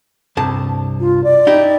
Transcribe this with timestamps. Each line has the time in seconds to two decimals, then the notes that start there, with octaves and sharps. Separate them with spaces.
0.37 C2 G2 A5
1.00 F4
1.24 D5
1.47 D#4 E4 G4